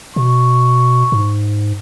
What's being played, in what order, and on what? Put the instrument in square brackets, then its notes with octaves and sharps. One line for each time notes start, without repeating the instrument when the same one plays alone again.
[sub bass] B2 [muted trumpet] C#6
[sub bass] G#2